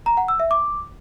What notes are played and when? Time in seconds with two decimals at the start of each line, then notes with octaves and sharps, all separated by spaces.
0.06 A#5
0.17 F#5
0.28 E6
0.40 E5
0.51 D6